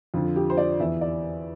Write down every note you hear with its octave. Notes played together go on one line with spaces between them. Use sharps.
F2 D3 F3 F4
G4
C5
D5
E2 E3 E5
D5